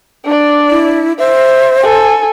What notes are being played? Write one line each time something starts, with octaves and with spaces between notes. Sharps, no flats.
D4 D5
E4
C5 E5
A4 G#5